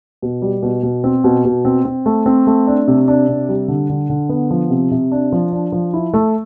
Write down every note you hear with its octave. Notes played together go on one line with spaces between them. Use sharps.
B2
G3
B2
B2
C4
B2
B2
C4
C4
A3
C4
A3
D4
C3
D4
C3
G3
D3
D3
D3
B3
F3
C3
C3
D4
F3
D4
F3
E4
A3